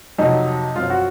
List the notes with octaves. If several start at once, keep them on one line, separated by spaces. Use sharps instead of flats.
F2 C3 F#3 D#4
F#2 F3 C4 F4
F#4